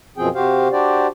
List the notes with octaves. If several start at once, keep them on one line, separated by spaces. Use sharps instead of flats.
F#2 B2 F3 C4 G#4 G5
C3 F#4 G4 C5 F5
D4 F#4 G4 C5 D5